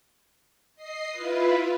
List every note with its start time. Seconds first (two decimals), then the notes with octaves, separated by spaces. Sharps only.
0.76 D#5 C7
1.11 E4 F4 B4